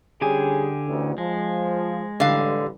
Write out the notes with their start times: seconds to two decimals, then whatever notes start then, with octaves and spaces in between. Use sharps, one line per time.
0.21 D3 G3 C#4 G4 G#4 G#5
0.87 A1 D2
1.18 F3 G#3
2.20 A1 D3 G3 F5